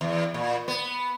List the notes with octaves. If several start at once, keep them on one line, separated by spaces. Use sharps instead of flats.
E2
A#2
B3